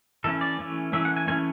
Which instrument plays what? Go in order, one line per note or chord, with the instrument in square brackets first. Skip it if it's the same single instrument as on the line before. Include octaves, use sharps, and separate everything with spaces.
[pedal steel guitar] E3 A3 C#4 A4
D5
E3 A3 C#4
E3 A3 C#4 E5
F#5
G#5
E3 A3 C#4 G#5